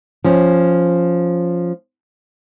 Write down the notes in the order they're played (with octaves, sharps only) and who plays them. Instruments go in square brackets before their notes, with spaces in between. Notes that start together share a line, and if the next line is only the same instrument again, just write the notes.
[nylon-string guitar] F3 C#4